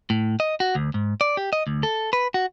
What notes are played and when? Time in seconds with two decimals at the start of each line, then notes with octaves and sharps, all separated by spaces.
0.10 A2
0.40 D#5
0.60 F#4
0.75 D2
0.94 G#2
1.21 D5
1.37 G4
1.53 D#5
1.67 D2
1.83 A4
2.13 B4
2.34 F#4